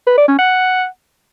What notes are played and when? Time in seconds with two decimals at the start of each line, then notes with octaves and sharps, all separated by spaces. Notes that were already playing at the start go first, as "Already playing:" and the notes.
0.07 B4
0.17 D5
0.28 C#4
0.38 F#5